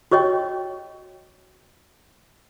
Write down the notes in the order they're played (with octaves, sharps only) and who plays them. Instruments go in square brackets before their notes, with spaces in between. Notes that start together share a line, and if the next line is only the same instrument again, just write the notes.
[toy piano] F#4 G4 C#5 D#5 G5